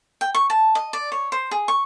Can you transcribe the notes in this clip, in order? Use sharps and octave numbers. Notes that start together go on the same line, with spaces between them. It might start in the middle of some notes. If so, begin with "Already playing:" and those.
G5
C#6
A5
D#5
D5
C#5
C5
G#4
C#6